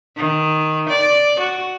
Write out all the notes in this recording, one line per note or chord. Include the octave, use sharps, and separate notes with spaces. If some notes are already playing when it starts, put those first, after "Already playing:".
D#3
D5
F#4